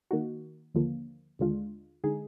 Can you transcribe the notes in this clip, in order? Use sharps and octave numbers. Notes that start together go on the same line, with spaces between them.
D#3 A#3 D#4 F#4
D#2 D3 F3 A#3
D#2 D3 G#3 D4 F4
D3 G#3 D#4 G#4